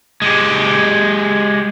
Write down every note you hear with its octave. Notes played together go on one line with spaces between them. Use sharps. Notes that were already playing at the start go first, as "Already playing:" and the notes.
G#3 G4